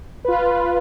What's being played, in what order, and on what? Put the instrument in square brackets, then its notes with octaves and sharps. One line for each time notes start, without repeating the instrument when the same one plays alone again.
[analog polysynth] F4 B4